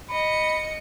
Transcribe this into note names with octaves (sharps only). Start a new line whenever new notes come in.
D#5 B5 C#7